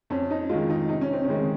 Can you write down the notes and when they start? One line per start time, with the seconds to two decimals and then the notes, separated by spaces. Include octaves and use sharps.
0.10 F2 C#4
0.30 D#4
0.49 D#3 G#3 F4
0.69 D#4
0.89 C3 D#4
1.01 C#4
1.13 C4
1.25 D#3 G#3 C#4